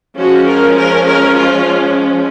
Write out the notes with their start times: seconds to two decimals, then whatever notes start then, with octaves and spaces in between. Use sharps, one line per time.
0.17 F3 G#3 C#4 F#4
0.47 A#4
0.77 A#4
1.06 A#4
1.35 F4